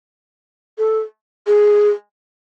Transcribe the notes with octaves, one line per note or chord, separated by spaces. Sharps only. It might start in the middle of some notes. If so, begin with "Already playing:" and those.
A4
G#4